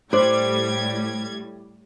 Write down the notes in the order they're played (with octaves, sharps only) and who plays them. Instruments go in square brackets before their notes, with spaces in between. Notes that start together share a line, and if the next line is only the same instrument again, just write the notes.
[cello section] A2 [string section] G3 G#6 [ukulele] D4 [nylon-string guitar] C5